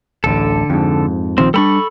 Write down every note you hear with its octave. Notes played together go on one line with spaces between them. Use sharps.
D1 A1 D3 A4
F2 G#2
A#1 D#3 F3 C4
G3 A3 D4 A4 B5 C#6